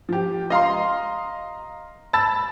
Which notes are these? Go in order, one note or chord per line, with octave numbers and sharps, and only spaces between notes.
F3 G4
D#5 F5 A#5 C6
A5 B5 E6 A6